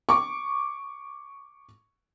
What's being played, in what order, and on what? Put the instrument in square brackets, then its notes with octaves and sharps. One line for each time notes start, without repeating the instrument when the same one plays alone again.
[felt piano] C#6 D6